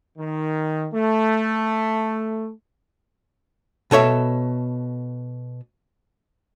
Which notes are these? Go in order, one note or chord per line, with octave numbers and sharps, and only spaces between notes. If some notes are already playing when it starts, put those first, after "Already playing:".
D#3
A3
B2 A4 C#5 E5